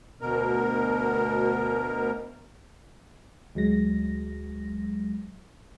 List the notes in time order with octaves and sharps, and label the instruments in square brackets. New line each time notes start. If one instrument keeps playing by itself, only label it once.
[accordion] D2 B2 A#4
[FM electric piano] D2 F#3 G#3 A#6